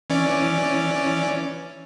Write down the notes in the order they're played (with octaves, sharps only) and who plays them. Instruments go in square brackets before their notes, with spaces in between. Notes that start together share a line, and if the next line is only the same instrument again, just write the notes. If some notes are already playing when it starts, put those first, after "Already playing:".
[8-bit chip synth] E3 C#4 D5